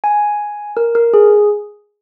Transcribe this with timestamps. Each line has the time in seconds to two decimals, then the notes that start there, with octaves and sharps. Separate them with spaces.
0.04 G#5
0.77 A#4
0.95 A#4
1.14 G#4